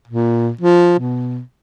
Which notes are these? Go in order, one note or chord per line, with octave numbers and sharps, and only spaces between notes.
A#2
F3
B2